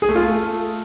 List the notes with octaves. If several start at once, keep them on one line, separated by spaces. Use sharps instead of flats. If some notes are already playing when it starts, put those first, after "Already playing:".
G#4
A3
F4
A3